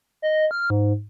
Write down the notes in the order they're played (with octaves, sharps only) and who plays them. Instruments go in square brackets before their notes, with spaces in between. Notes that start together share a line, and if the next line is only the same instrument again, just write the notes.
[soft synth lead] D#5
F6
G#2